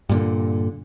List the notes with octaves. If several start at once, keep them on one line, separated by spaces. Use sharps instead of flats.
G2 A#2 D3